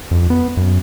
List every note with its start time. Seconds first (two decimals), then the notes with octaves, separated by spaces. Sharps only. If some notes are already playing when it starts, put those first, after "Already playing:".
0.11 F2
0.30 B3
0.57 F#2